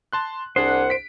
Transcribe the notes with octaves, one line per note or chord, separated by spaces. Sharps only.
A5 C6 F#6
C2 D4 G#4 C5 F#5
B6 D7